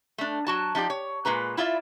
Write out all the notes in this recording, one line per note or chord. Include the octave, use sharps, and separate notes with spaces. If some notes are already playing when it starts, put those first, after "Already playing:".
A3 D4
F#3 F#4 A5
F3 D#4 G4 D5
C#5
A#2 G#3 B4 A#5
E4 F4 D5 E5